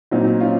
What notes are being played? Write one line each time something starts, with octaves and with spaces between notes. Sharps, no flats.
A#2 F#3 C4 D#4
C#4 F4